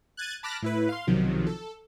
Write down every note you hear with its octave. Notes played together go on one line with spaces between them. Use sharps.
F#6 G#6 A6 D#7
A5 B5 D6 F6 F#6 A#6
A2 E4 B4
F5 C6
B1 C3 D#3 F3 F#3
A4